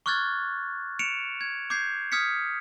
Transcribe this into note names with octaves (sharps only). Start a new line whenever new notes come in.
C#6 D6 F6 F#6 G#6 A6
C#7 D7 E7 F7
G#6
D6 G6 G#6 C7
D#6 F6 G#6 B6 C#7